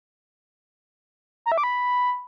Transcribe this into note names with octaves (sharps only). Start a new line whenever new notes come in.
A#5
E5
D6
B5